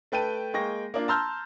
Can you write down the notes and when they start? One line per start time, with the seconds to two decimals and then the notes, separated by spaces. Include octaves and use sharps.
0.12 A3 B4 G5 A5 D#7
0.54 G#3 A#3 G5 C#6 A#6
0.94 A#3 D4 F4
1.08 A5 A#5 C6 E6 F6 G6